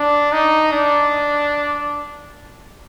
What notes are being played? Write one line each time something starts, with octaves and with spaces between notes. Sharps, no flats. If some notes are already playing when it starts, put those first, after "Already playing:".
Already playing: D4
D#4
D4